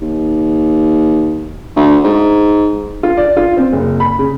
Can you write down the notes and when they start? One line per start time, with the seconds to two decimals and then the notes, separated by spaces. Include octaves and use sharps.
0.02 D#2
1.76 D2
2.05 G#2
3.03 F4
3.17 D5
3.37 F4
3.57 C4
3.73 F#1
4.00 B5
4.19 C#3